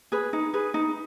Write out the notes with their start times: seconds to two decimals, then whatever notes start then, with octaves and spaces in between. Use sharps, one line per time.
0.12 G#4 B4
0.33 D#4
0.54 G#4 B4
0.74 D#4